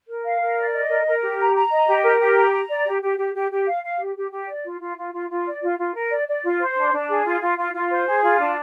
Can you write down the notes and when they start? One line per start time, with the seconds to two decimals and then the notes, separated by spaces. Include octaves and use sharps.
0.08 A#4
0.24 F5
0.40 A#4
0.57 D5
0.74 D#5
0.89 A#4
1.05 A#4
1.22 G4
1.38 A#5
1.54 A#5
1.71 D#5
1.87 G4
2.04 A#4
2.20 G4
2.35 A#5
2.52 A#5
2.68 D5
2.86 G4
3.01 G4
3.18 G4
3.34 G4
3.50 G4
3.66 F5
3.83 F5
3.99 G4
4.16 G4
4.31 G4
4.48 D5
4.64 F4
4.80 F4
4.97 F4
5.13 F4
5.30 F4
5.45 D5
5.62 F4
5.78 F4
5.95 A#4
6.10 D5
6.27 D5
6.44 F4
6.60 C5
6.76 D4
6.93 D4
7.08 G#4
7.24 F4
7.41 F4
7.58 F4
7.73 F4
7.90 C5
8.07 G#4
8.23 F4
8.39 D4